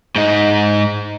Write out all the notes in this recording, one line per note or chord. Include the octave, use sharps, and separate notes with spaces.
G#2 D#4